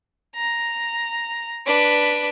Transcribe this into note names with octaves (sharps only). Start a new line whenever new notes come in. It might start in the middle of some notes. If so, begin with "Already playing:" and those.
A#5
D4 B4